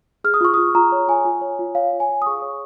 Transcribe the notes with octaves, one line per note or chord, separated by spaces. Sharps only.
G#4 F6
D#6
F4 C#6
F4 D#6
F4 A#5
C#5
F4 G#5
F4
C#5
F4
C#5 F5
F4
G#5
F4
D#6
G#4 C#6
C#5